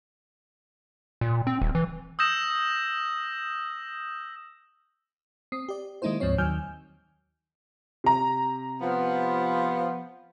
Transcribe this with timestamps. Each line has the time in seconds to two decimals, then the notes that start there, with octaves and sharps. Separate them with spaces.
1.21 A#2
1.47 C4
1.61 D#1
1.75 E3
2.19 D#6 E6 G6 A#6 E7
5.52 C4 D#6 C7
5.69 G4 D5
6.02 D#3 G#3 A#3 D#4 E4 C5
6.20 D2 G#2 F3 C4 C#5
6.38 D#2 D#3 F#3 G#5 F6 G6
8.04 C3 A#5
8.81 F3 B3